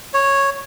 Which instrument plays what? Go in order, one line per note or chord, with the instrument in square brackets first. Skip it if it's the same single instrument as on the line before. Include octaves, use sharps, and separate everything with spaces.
[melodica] C#5